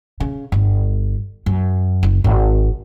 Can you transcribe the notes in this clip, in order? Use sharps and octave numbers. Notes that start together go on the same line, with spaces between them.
C#3
G1
F#2
F#1
G#1